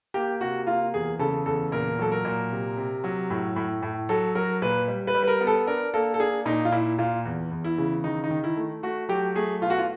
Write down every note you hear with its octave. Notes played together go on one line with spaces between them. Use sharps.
A#3 G4
C3 F#4
A#3 F4
E2 G#4
C#3 A4
E2 A4
A#2 A#4
F#3 A4
A#4
A#2
C3
C3
F#3
A2
A2
A2
F#3 A4
F#3 A#4
A#2 B4
G3
B4
G3
B4
A#4
B3
A4
D4 A#4
A#3 A4
A4
D4 G#4
A#2 D#4
F4
A#2 E4
A#2 F4
E2
E2
E4
C#3
D#3 D#4
D#4
D#3
E4
A3
A3 F#4
F#3 G4
A3 G#4
B2 F4
F#4
F4